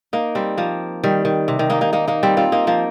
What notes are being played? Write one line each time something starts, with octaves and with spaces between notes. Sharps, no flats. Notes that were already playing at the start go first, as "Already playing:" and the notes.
A#3 D#4
G3 C4
F3 A#3
D#3 G3
D#3
C3
D#3
A#3 D#4
A#3 D#4
A#3 D#4
A#3 D#4
G3 C4
C4 F4
A#3 D#4
F3 A#3